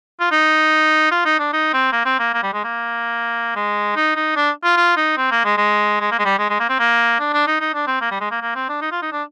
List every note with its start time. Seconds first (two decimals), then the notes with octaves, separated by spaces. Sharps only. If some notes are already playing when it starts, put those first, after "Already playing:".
0.20 F4
0.32 D#4
1.11 F4
1.25 D#4
1.39 D4
1.53 D#4
1.73 C4
1.93 A#3
2.06 C4
2.20 A#3
2.34 A#3
2.43 G3
2.53 G#3
2.64 A#3
3.56 G#3
3.96 D#4
4.16 D#4
4.36 D4
4.64 F4
4.77 F4
4.97 D#4
5.17 C4
5.31 A#3
5.45 G#3
5.58 G#3
6.01 G#3
6.11 A#3
6.19 G#3
6.25 G3
6.39 G#3
6.50 G#3
6.60 A#3
6.69 C4
6.79 A#3
7.20 D4
7.33 D4
7.48 D#4
7.61 D#4
7.74 D4
7.87 C4
8.01 A#3
8.12 G3
8.21 G#3
8.31 A#3
8.41 A#3
8.55 C4
8.69 D4
8.82 D#4
8.92 F4
9.02 D#4
9.12 D4